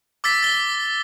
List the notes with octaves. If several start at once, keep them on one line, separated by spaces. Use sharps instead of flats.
D6 E6 A6 B6
A6 G7